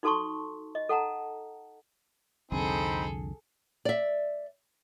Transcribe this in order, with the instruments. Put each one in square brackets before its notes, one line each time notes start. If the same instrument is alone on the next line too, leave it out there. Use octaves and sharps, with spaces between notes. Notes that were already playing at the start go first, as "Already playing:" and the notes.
[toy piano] D#4 F#4 A4 A5 C6 C#6
D#5
A4 F#5 A5 A#5
[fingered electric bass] C2 F2 D3 [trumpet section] C4 D#4 B5 [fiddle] G#4 A4
[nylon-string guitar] D5 E5